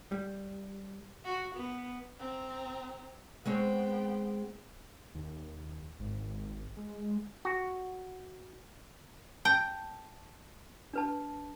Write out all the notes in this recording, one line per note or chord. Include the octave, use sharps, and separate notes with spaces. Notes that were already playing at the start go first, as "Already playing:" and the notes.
G3
F#4
B3
C4 A#5
G#3 B3 C4 C#5 G5
D#2
G#1
G#3
F#4
G5 A5
D4 B4 A5